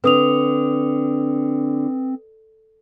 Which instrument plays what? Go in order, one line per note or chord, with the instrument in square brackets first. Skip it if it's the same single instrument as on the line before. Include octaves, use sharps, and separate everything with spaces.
[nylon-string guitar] D3 [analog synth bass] C4 [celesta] B4 D#6 F7